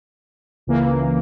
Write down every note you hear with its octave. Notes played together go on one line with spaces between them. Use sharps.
C#2 C#3 E3 A#3